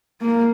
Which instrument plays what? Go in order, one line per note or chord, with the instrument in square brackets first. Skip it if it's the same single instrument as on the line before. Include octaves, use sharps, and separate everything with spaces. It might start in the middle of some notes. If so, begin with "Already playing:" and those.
[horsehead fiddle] A#3